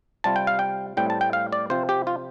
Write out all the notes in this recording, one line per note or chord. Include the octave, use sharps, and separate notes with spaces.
C3 G3 F4 A5
G5
F5
G5
A2 G3 C4 G5
A5
G5
F5
D5
C3 F3 C4 F4 C5
G4
F4